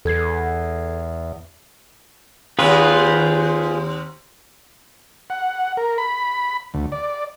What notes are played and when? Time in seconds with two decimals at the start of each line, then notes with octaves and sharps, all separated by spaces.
0.05 E2 A4 G#6 C7
2.59 D#2 C4 F4 G#4 B4
5.30 F#5
5.77 A#4
5.98 B5
6.74 D2
6.92 D5